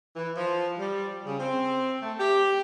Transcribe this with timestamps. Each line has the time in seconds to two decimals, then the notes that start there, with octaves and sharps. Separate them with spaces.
0.16 E3
0.36 F3
0.79 G3
1.26 C#3
1.39 C4
2.02 A3
2.19 G4